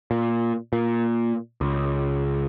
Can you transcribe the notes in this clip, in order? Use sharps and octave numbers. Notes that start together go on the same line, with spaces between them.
A#2
A#2
C#2